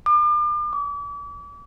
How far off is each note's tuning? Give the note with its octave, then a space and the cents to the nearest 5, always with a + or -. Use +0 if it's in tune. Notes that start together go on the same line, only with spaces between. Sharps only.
D6 +40
D6 -40